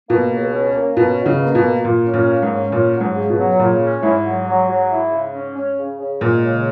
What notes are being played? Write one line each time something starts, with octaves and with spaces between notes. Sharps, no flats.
B2 A#3
C#2
C#4
A#3
B2 C#4
B2
C#3
A#3
B2
A#3
A#2 A#3
C#4
A#2
A#3
G#2
C#4
A#2 C#4
F#3
G#2
C#3
B2
F#3
A#2 C#3
C#4
G#2 E4
F#3
F#3
F#3
E4
C#3
C#4
C#4
C#3
C#3
A#2 G#3
C#3